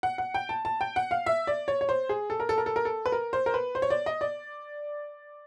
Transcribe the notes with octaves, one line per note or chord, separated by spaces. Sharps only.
F#5
F#5
G5
A5
A5
G5
F#5
F5
E5
D5
C#5
C#5
C5
G#4
A4
A#4
A4
A#4
A4
A#4
A4
B4
A#4
C5
A#4
B4
C5
C#5
D5
D#5
D5